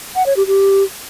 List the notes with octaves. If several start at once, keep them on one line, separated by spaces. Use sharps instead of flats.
F#5
C#5
G4
G4